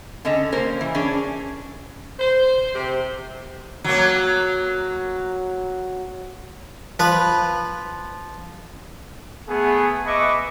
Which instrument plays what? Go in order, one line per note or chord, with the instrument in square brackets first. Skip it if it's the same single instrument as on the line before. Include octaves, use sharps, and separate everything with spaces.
[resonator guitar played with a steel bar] D3 C#4 A4 D#5
A#3 C#4 A#4 C5
E3
C#4 D4 G#4
[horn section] C5
C3
[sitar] F#3 A#3
[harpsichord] F3 B4
[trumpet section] A3 B3 G#4
B4 D#5 E5 B5 C#6 D6